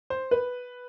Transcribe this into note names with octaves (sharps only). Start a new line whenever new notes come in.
C5
B4